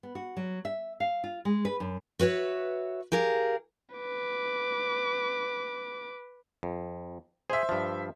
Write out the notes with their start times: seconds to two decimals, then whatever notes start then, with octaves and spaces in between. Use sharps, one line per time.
0.03 B3
0.15 F#4
0.37 F#3
0.65 E5
1.00 F5
1.24 F4
1.45 G#3
1.65 B4
1.80 F#2
2.19 F#4 B4 C#5 E5
3.12 G4 G#4 A#4 F5
3.96 B4 D6
6.63 F2
7.50 G#4 C5 E5
7.69 G2 F3